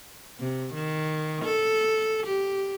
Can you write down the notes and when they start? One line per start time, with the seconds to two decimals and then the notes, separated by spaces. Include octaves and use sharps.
0.40 C3
0.74 D#3
1.45 A4
2.26 G4